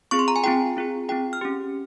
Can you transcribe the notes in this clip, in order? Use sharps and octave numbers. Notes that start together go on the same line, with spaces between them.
C4 F4 G#4 C#6
C6
A#5
G#5
C4 F4 G#4 G5
C4 F4 G#4
C4 F4 G#4 G5
F6
C#4 G4